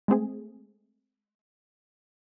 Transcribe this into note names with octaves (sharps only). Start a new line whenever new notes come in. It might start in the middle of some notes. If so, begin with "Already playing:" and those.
G#3 A3 C4 G#4